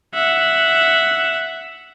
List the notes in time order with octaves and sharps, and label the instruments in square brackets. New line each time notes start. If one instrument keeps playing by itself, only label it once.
[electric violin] E5 F#5